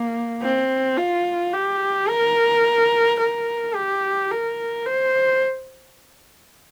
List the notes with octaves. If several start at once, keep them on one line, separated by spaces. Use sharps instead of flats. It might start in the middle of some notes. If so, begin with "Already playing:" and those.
Already playing: A#3
C4
F4
G4
A#4
A#4
G4
A#4
C5